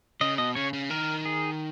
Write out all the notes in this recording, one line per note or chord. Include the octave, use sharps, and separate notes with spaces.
C#3 D#5
B2 D#5
C#3 C#5
C#3
D#3 A#4
G#4